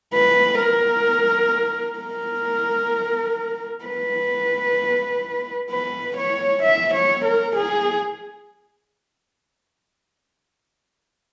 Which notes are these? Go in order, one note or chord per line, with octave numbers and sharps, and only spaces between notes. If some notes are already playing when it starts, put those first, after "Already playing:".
B4
A#4
A#4
B4
B4
C#5
E5
C#5
A#4
G#4